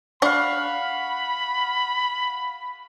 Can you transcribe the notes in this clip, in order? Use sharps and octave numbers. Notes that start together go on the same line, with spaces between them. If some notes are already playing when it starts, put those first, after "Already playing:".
D4 F5 F#5 B5 C#6